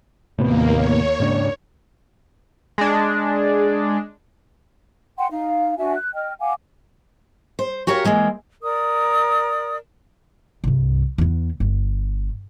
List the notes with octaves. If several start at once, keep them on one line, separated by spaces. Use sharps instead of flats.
D#2 A2 C3 A#3 B3
C#5
G#2 C#3 D4
G#3 D4
F#5 G5 C6
D#4 F5
D4 F#4 E5 G#5
F#6
D#5 G5 F6
F5 F#5 G#5 D6
C5
F#4 G4 A#4 C#5 D#5 F5
E3 G#3 A#3 C4
A#4 D5 D#6
C2 G2
E2 B3
G1